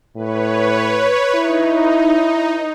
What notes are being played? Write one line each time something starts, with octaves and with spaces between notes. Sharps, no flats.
A2 B4 C#5
D#4 E4